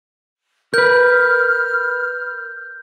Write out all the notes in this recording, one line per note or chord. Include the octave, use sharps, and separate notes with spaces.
A#4 B4 F6 G6